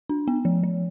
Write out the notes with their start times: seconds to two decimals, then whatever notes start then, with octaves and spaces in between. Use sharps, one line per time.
0.09 D4
0.28 B3
0.45 F3
0.63 F3